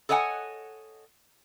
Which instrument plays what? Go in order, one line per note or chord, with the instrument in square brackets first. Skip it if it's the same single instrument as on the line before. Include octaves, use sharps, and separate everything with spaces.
[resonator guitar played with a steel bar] A4 C#5 D#5 F#5 G#5